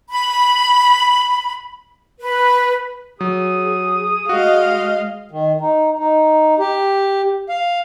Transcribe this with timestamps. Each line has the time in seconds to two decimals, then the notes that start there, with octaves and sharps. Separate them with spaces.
0.10 B5
2.20 B4
3.21 F#3 G#4 D#6
4.29 G#3 F#4 D#5 F5
5.31 D#3
5.61 D#4
5.98 D#4
6.59 G4
7.49 F5